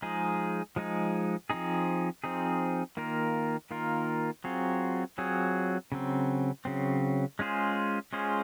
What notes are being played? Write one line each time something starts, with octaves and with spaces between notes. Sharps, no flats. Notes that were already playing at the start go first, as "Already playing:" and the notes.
F3 G#3 D#4 G#4
F3 G#3 D#4 G#4
F3 C4 D#4 G#4
F3 C4 D#4 G#4
D#3 A#3 F4 A#4
D#3 A#3 F4 A#4
F#3 C4 F4 G#4 C#5
F#3 C4 F4 G#4 C#5
C#3 F#3 C4
C#3 F#3 C4
G#3 C#4 F4 G#4 C5
G#3 C#4 F4 G#4 C5